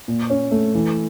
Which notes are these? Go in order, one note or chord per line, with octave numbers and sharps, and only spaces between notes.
A#2
C#4
A3
E3